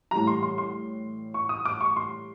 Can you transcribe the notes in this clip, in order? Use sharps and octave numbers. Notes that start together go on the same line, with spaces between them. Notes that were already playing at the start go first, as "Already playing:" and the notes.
A2 E3 G3 A#5
C6
C6
C6
C#6
D#6
D6
C#6
C6